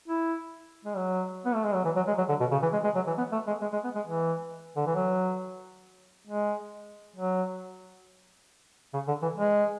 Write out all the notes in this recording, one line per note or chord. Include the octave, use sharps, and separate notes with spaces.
E4
G#3
F#3
B3
A3
G#3
F#3
E3
F#3
G#3
F#3
D3
B2
C#3
E3
G#3
G#3
F#3
E3
B3
A3
G#3
G#3
G#3
B3
G#3
E3
D3
E3
F#3
G#3
F#3
C#3
D3
E3
G#3